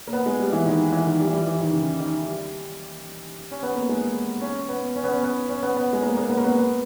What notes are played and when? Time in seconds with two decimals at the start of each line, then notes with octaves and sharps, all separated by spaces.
0.07 A#3
0.13 B3
0.26 G#3
0.40 G3
0.52 E3
0.66 D#3
0.92 E3
1.06 D#3
1.19 G3
1.27 E3
1.33 G3
1.47 E3
1.60 D#3
1.73 C#3
2.00 D#3
2.28 G3
3.51 C#4
3.63 B3
3.75 A#3
3.89 G#3
4.41 C#4
4.68 B3
4.96 C#4
5.04 B3
5.11 C#4
5.23 B3
5.49 C#4
5.63 B3
5.77 B3
5.93 G#3
6.03 A#3
6.17 A#3
6.29 B3
6.37 A#3
6.44 B3
6.56 B3